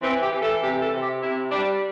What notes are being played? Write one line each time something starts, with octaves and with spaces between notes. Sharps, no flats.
E3 C4
G4
E3
A4
C3 G4
A4
C3
G4
C3 E4
G3 D4